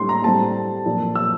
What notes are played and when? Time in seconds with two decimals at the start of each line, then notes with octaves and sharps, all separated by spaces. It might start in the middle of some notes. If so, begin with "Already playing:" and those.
Already playing: A2 G3 D4 C6
0.09 A#5
0.24 A2 G3 C4 A5
0.86 A#2 F3 A#3
1.15 E6